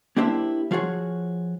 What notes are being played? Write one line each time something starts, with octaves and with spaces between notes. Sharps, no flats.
A#3 D4 E4 G4 C5 E5
F3 F4 F#4 G#4 C#5